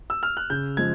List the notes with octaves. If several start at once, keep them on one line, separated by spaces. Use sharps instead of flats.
E6
F6
F#6
C#3 G6
F3 G#3 G#6